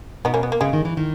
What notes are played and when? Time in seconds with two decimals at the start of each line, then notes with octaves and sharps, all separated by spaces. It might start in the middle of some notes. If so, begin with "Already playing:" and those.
0.25 B2 B3 D#4
0.34 A#3 C#4
0.43 B3
0.52 A#3
0.61 C#3 G#3
0.73 D#3
0.85 E3
0.97 D#3